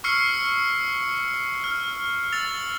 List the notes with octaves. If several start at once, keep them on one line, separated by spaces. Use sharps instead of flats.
C#6 E6 F6 C7 C#7
F6
E6 A6 F7